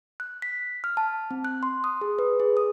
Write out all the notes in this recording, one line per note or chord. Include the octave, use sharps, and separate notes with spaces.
F#6
B6
F6
A5
C4
F#6
C6
D#6
G#4
B4
G#4
D#6